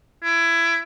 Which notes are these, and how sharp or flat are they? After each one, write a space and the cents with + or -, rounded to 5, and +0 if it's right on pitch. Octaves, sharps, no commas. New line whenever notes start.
E4 +25